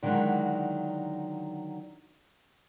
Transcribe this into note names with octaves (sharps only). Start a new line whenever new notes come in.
D3 D#3 F#3 G#3 D4 E4